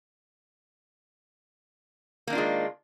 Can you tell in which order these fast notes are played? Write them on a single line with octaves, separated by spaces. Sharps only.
A#3 D#3 D4 F4 G#3